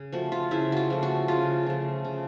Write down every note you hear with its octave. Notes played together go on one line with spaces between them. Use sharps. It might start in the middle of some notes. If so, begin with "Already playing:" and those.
Already playing: C#3
F3 A3 F#4
F4
C#3 E4
F4 F#4
F3 A3
F#4
C#3 F4
F3 A3
C#3